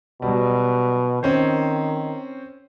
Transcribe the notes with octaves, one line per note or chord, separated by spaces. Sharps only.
B2 F#3 G3
D#3 C4 C#4 C5